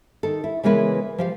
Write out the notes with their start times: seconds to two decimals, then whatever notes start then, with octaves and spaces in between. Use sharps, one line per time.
0.23 D#3 A4
0.44 E4
0.63 C#3 E3 G#3 A#3 B3 B4
1.18 F3 G4 F5